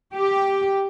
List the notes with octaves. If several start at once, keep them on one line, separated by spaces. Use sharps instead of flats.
G4